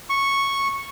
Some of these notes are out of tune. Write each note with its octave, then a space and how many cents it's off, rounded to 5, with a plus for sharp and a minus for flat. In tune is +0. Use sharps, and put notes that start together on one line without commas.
C#6 -5